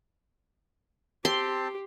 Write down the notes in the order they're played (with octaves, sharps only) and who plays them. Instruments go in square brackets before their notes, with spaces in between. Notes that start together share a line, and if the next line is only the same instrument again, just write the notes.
[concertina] C4 A5 [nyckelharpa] G4 [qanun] C6